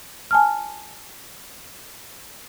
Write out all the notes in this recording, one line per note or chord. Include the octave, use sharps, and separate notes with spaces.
G#5 A5 F6